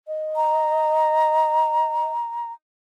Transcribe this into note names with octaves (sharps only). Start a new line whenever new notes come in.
D#5
A#5